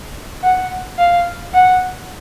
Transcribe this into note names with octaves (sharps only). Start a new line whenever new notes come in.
F#5
F5
F#5